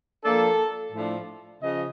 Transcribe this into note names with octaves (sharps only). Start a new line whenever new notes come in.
F3 A#3 D4 A4
A2 F3 A3 D4
C#3 F3 D#5